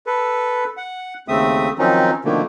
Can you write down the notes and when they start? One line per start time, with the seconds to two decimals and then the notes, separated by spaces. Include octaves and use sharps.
0.06 A4 B4
0.77 F#5
1.28 D#2 C#3 A3 C4 E5 D#6
1.79 D#3 F3 F#3 C4 C#4 D#4
2.24 B2 D3 D#3 F3 A3 A#3